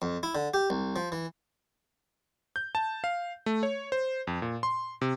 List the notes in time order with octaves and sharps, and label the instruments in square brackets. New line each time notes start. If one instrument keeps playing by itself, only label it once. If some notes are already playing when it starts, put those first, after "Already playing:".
[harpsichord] F2
E4
D3
G4
C2
F3
E3
[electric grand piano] G6
A5
F5
A3
C#5
C5
F2
A#2
C6
C3